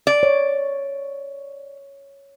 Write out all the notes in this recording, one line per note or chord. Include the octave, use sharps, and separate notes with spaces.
D5
C#5